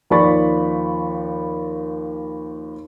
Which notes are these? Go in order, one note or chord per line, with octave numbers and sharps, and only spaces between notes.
D#2 F3 D5 B5 C#6 A6